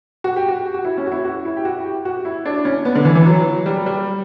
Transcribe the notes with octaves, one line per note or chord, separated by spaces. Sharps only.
F#4
G4
F#4
F#4
E4
C#4
F#4
E4
F#4
E4
G4
F#4
G4
F#4
E4
D4
C#4
B3
D3
E3
E3
F#3
G3
G3